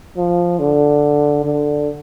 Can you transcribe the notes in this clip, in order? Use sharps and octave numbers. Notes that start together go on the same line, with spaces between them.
F3
D3
D3